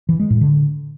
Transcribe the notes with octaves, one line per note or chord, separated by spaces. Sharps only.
E3
G#3
A2
D3